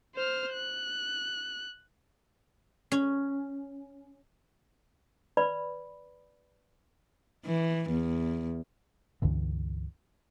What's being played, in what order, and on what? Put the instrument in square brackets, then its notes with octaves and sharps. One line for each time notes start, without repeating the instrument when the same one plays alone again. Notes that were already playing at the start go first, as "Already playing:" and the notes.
[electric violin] C5 F6
F#6
[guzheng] C#4
[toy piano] B4 D5 B5
[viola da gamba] E3
E2
[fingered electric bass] C#2 G2 D3 E3